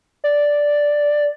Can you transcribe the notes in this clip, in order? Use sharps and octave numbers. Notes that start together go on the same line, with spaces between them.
D5